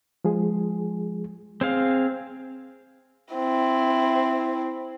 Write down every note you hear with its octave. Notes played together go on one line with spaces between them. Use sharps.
F3 G#3 G#4
C4 G#4 F5
C4 E4